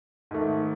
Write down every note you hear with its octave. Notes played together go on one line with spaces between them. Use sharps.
G#2 D#3 A3